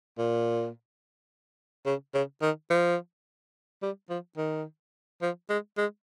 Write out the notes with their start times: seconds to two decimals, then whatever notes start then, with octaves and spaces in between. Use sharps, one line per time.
0.18 A#2
1.86 C#3
2.14 C#3
2.42 D#3
2.70 F3
3.82 G3
4.09 F3
4.37 D#3
5.22 F3
5.49 G#3
5.77 G#3